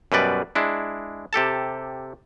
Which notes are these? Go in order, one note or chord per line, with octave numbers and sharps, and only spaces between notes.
F#2 B2 G3 B4 D5
G#3 D4 E4
C3 G4 A4 A5